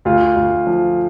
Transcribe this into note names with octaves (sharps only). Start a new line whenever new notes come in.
D2 F4
D2
F3